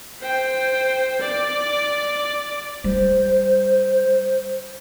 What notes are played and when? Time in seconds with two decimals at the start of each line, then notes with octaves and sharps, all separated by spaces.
0.20 C5 G5
1.20 D5
2.84 G3 C5